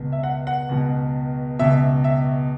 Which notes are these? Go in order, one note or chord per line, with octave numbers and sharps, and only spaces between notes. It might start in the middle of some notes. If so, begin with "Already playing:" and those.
Already playing: C#2 B2
E5
F#5
F#5
C#2 B2
C#2 B2 E5
E5